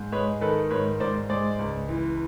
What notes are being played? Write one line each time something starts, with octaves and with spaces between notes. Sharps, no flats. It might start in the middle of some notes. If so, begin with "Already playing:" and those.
Already playing: G#2
G#3 B4 C#5
D#3 A4 B4
G#2 B4 C#5
G#2 C5 D5
G#3 C5 D5
C#2
E3